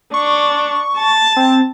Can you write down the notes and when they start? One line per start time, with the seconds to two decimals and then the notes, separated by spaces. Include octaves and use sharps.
0.14 D4 C#6
0.97 A5
1.36 C4